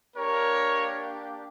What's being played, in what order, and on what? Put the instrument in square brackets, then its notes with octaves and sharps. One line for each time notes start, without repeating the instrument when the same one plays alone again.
[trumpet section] A#3 D4 G4 A#4 C#5